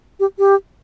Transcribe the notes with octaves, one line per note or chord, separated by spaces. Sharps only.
G4
G4